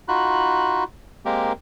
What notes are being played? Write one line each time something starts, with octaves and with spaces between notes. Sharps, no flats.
D#4 F4 F#4 B5 F#6
G#3 A#3 C4 G4 A#4